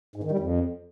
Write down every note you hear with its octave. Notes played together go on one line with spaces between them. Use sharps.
G#2
D#3
G3
F2